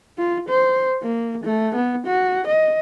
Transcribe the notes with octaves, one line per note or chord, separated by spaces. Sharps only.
F4
C5
A#3
A3
B3
F#4
D#5